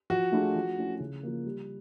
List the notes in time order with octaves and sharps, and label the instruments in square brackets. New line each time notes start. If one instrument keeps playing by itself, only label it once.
[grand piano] F3 [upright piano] F#4
[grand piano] A3 D4 F4 G#4
F3
A3 C#4 E4
C#3
F3 A#3
G3